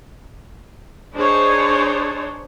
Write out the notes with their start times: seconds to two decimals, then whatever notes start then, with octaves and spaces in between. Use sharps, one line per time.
1.14 D4 D#4 G#4 C5 C#5